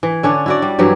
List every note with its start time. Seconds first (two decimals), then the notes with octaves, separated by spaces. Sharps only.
0.03 E3
0.23 D3 C#4 D4
0.46 E4 F#4 D5
0.62 G3
0.79 G2 E3 F#3 G4